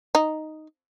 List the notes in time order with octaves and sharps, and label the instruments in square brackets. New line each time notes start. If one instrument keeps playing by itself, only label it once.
[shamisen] D#4